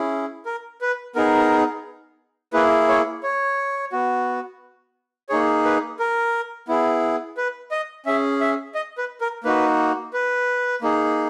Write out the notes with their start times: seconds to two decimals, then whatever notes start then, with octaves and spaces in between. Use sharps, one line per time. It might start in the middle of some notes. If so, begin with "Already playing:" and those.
Already playing: C#4 E4 G#4
0.46 A#4
0.81 B4
1.16 B3 D#4 G#4 A#4
2.53 A#3 E4 G#4 B4
2.88 C#5
3.23 C#5
3.92 B3 F#4
5.29 A#3 D#4 G#4 C#5
5.65 B4
5.99 A#4
6.68 B3 E4 G#4
7.37 B4
7.71 D#5
8.06 C#4 G#4 E5
8.40 E5
8.75 D#5
8.98 B4
9.21 A#4
9.44 A#3 D#4 F#4 B4
10.13 B4
10.82 A#3 D#4 G#4